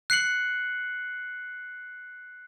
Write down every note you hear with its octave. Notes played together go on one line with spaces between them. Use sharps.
F#6 C7 C#7 F#7